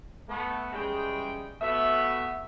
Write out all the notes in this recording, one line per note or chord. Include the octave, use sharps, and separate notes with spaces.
A3 B3
C#3 E3 G3 G#3 G#4 G5
A3 B3 F#4 E5